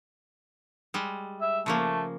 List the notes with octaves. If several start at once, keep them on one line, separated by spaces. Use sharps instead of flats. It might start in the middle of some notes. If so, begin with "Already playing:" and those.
G3 G#3
E5
C#3 F3 A3 A#3